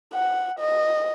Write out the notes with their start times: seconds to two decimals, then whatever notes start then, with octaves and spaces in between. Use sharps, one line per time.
0.13 F#5
0.60 D#5